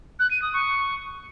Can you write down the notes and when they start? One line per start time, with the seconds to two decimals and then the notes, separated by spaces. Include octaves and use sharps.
0.20 F#6
0.31 D#7
0.42 D#6
0.53 C#6